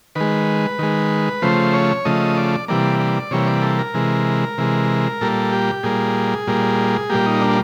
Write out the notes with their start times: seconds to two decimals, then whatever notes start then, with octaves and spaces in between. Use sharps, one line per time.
0.15 D#3 G#3 B4
0.79 D#3 G#3
1.42 C#3 F3 A3 C5
1.74 C#5
2.05 C#3 F3 A3 D#5
2.37 D5
2.68 C3 E3 G3 A#3 D5
3.00 D5
3.31 C3 E3 G3 A#3 C#5
3.47 D5
3.63 A4
3.79 A#4
3.94 C3 E3 G#3
4.58 C3 E3 G#3
5.21 A#2 G3 A#3 A4
5.52 G4
5.83 A#2 G3 A#3 G#4
6.47 A#2 G3 A#3
7.10 A#2 G3 A#3 G4
7.26 D#4
7.41 D4